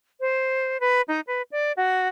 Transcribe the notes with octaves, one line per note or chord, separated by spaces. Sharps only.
C5
B4
D#4
B4
D5
F#4